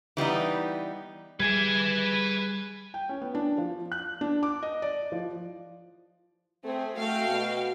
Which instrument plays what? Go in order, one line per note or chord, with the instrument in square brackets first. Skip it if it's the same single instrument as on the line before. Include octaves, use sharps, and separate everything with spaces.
[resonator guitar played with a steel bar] E3 G3 B3 D#4
[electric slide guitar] G3 G#4 [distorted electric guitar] B4 G#5 [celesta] G#6
[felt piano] G5
C#4
B3
D4
F3
F#6
D4
D6
D#5
D5
F3
[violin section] A3 G#4 [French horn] C4
[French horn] A3 [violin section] F#4 F5 G5
[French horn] B2